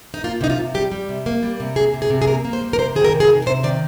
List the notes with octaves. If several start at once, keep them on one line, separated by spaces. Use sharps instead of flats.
D#4
A#3 F4
C3 D#4
F4
C3
G3 G4
G3
C3
A#3
G3
C3
A#3 G#4
C3
G#4
C3
G#4
A#3 A#4
A#3
C5
G3
A#4
C3 C5
D#3 G#4
A#4
C3
G#4
D#3 A#4
A#4
C3 C5
D#3 D5